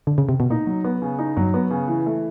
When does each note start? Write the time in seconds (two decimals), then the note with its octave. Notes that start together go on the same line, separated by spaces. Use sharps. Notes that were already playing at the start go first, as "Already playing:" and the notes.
0.07 D3
0.18 C#3
0.29 C3
0.40 B2
0.50 A#2 D#4
0.67 F#3
0.84 B3
1.02 C#3
1.19 D#4
1.37 G2 F#3
1.54 B3
1.71 C#3
1.88 E3
2.06 A3